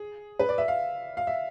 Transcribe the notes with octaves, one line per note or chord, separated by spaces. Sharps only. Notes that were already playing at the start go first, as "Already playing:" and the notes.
Already playing: G#4
B4
D5
E5
F5
F5
E5